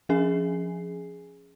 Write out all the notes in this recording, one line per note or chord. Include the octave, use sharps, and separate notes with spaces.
F3 C#4 G#4 G#5 C7